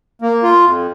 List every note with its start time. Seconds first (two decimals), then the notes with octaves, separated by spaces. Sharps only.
0.22 A#3
0.43 F4
0.64 F2